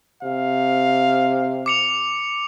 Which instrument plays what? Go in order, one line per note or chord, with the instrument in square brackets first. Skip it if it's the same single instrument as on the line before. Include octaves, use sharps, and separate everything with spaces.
[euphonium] C3 [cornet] F5
[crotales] D6 C#7 F7